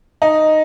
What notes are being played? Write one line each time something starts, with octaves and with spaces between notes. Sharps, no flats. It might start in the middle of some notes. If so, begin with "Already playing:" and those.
D#4